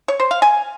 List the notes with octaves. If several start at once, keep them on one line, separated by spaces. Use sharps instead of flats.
C#5
C5
F5
G#5